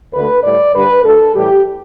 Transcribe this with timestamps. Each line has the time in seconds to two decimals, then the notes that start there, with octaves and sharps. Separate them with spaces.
0.13 D2 D3 A3 B4
0.43 A2 G3 D5
0.74 G2 D3 G3 B4
1.04 D2 D3 A3 A4
1.34 A2 E3 G3 G4